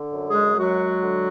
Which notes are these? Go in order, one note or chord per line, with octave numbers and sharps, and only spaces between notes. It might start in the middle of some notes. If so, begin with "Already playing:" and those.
Already playing: D3
F#2
G#3 G#4
F#3 G#3 F#4
D3